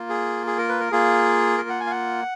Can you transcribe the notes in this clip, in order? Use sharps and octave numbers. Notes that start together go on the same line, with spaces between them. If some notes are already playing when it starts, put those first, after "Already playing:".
Already playing: A#3 F4
G#4
G#4
A#4
B4
A#4
A#3 F4 G#4
A#4
F#5
G#5
F5
F#5